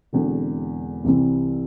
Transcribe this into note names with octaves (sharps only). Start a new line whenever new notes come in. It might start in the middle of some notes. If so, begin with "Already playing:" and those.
E1 E2 D3 C4
C2 C3 E3 G3 C4